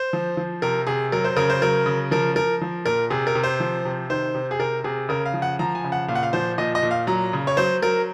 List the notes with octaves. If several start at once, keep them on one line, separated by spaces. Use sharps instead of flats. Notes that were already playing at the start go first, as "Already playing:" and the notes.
Already playing: C5
F3
F3
C3 A#4
C3 G#4
F#3 A#4
C5
C#3 A#4
C5
F#3 A#4
C#3
F3 A#4
F3 A#4
F3
A#2 A#4
C3 G#4
A#4
C3
C5
F3
C3
D#3 C5
C3
G#4
C3 A#4
C3 G#4
C#3 A#4
F5
F3
F#5
F3 A#5
G#5
C#3
F#5
A#2 F5
F#5
F5
F3 C5
A#2 D#5
D#5
A#2
F5
F#3 A#5
C#3
C#5
F#3 C5
F#3 A#4